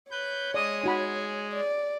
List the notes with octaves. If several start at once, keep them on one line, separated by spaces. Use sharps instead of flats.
B4 C#5 G6
G#3 D5 D#5 D#6
D#4 F#4 G#4 B5
D5